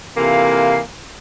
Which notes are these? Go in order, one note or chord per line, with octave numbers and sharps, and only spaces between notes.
C3 E3 A#3 F4 A4 F5